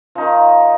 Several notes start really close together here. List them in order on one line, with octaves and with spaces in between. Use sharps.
F3 D#4 D#3